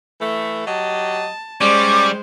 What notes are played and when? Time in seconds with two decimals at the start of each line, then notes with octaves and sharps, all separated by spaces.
0.21 E3 A3
0.66 F#3 G4 D#5 A5
1.61 G3 G#3 C#4 C5 D5 D6